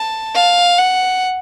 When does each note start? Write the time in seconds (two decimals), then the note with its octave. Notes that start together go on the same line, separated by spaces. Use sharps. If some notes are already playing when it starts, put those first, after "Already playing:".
Already playing: A5
0.35 F5
0.78 F#5